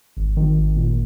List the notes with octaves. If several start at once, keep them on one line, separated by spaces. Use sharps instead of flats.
G#1
D#3
G#1
A#2